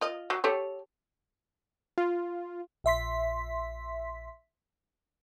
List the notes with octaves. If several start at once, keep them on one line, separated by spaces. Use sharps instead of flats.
F4 D#5
F#3
G4 A4 C#5
F4
A#1 E5 C6 B6